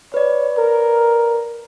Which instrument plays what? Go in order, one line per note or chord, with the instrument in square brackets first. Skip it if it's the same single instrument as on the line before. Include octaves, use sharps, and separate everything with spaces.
[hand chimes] B4 D5 [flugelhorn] C#5
[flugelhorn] A#4